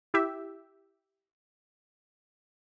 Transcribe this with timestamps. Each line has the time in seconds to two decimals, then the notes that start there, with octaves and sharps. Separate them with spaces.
0.14 E4 G4 E5